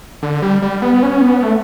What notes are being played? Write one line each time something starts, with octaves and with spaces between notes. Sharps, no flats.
D3
G3
G3
B3
C#4
B3
A3